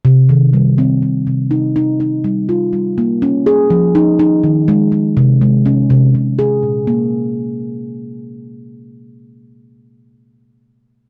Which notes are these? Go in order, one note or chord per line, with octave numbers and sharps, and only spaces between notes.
C3
D#3
G3
C4
C3
C3
D#4
D#4
D#4
G3
F4
G3
A#3
C#4
G#4
F3
D#4
D#4
D#3
G#3
G#3
C3
G#3
C#4
C3
C3
G#4
A#2
A#3